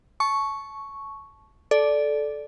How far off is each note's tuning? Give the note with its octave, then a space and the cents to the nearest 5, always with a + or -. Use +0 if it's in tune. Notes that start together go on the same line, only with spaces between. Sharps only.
A5 -20 C#6 +0
A4 -15 D5 +0